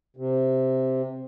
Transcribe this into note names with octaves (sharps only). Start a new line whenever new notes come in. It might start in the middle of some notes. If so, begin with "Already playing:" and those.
C3